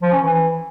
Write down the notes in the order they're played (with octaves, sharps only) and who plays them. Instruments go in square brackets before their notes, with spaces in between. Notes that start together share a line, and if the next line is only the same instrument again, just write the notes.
[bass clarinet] F3
C#4
E3